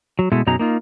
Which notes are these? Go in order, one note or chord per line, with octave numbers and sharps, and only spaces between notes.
F#3
B2 G#3 A3 E4
F#2 B2 F#3 D#4 G#4 A#5
A#3 D#4 F4